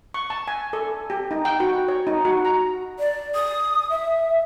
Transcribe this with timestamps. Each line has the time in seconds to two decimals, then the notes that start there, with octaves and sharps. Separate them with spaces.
0.14 C#6
0.30 A5
0.48 G#5
0.73 A4
1.10 G4
1.31 D#4
1.45 G5
1.60 F#4
1.88 C#5
2.07 D#4
2.25 F#4
2.45 A#5
2.99 D5
3.35 D#6
3.90 E5